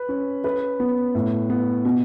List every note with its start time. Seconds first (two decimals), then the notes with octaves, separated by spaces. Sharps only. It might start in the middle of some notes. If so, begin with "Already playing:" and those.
Already playing: B4
0.09 C#4
0.44 B4
0.80 B3
1.15 A2
1.50 B3
1.85 B2